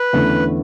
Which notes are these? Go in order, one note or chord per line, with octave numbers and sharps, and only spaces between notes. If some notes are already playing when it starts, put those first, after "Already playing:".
Already playing: B4
E2 D3 A3 C#4 E4